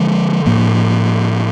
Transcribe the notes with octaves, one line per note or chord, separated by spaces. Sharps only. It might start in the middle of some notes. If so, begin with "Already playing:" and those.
Already playing: D3 F3 G#3
A2 F3 A#3